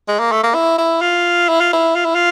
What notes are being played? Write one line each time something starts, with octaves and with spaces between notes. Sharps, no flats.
G#3
A#3
A3
A#3
E4
E4
F4
E4
F4
E4
F4
E4
F4